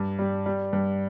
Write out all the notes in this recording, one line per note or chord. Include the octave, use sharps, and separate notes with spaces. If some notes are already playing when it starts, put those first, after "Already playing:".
Already playing: G2
G3
G3
G2